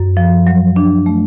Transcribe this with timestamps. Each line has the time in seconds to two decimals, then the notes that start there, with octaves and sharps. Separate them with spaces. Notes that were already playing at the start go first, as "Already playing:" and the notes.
Already playing: F#2
0.17 F3
0.47 F#3
0.76 D4
1.06 A3